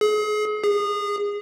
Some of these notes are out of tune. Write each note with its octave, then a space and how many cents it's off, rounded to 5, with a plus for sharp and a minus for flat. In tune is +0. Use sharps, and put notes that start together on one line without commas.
G#4 +35
G#4 -25